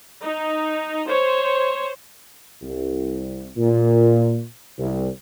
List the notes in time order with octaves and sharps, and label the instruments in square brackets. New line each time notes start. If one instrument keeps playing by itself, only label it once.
[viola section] D#4
C5 C#5
[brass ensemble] C2
A#2
C2